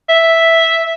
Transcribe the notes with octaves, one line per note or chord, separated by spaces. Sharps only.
E5